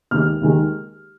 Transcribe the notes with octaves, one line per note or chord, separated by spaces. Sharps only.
D#2 D#3 G#3 F6
D#2 D#3 G#3